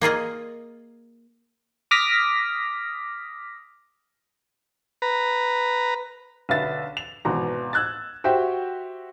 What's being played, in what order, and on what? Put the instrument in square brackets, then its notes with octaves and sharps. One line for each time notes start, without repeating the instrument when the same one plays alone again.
[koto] A#3 F4 G#4 D#5
[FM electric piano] D6 D#6 F6 A#6 B6
[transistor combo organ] B4 A#5
[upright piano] B1 D3 B4 E5 A6
F7
G#1 B2 E3 A#5
E6 F#6 G#6 A6
F#4 G4 C5 E5 G5